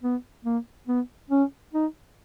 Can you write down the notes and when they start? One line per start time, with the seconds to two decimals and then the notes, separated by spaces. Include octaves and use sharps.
0.03 B3
0.45 A#3
0.87 B3
1.30 C#4
1.73 D#4